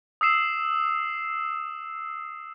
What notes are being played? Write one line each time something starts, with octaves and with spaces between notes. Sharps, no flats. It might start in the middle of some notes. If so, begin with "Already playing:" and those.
D#6 E6 C7 E7